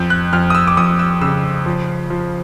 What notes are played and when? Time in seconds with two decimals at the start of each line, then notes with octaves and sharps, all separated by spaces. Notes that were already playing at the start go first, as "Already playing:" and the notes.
Already playing: F2 G6
0.10 F#6
0.33 F2 F6
0.50 D#6
0.55 E6
0.67 D6
0.77 F2 D#6
0.99 E6
1.21 C#3 E6
1.66 F3
2.10 F3